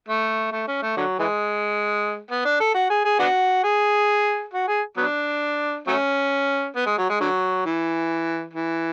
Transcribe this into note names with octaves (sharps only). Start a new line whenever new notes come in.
A3
A3
C#4
A3
D3 F#3
E3 G#3
B3
D4
A4
F#4
G#4
G#4
B3 D4 F#4
G#4
F#4
G#4
F#3 B3 D4
F#3 A3 C#4
B3
G#3
F#3
G#3
D3 F#3
E3
E3